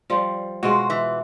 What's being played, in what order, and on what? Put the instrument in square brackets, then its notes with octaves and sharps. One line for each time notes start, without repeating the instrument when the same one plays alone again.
[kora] F3 G3 F4
[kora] B2 G#3 F4 [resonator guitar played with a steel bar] F#4
[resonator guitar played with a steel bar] E3